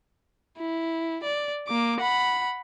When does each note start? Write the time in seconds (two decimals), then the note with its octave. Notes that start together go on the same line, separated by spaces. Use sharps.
0.59 E4
1.23 D5
1.67 A#3 D6
2.01 F#5 B5